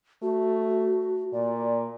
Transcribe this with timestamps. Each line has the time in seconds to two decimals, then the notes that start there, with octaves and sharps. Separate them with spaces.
0.22 A3 F#4
1.33 A#2 D5